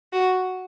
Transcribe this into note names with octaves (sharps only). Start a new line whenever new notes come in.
F#4